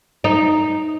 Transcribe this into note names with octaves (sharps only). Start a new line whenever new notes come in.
D#4